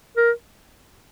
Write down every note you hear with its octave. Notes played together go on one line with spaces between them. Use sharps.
A#4